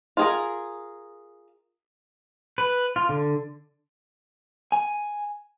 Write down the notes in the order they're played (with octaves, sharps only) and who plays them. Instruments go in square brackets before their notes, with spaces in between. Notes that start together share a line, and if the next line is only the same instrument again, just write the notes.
[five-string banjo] F4 G#4 A#4
[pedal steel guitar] B4
F4
D3
[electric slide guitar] G#5